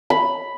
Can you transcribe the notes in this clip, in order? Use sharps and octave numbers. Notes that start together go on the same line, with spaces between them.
B5